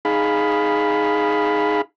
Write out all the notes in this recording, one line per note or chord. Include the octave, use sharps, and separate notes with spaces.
D#4 G#4 F5 B5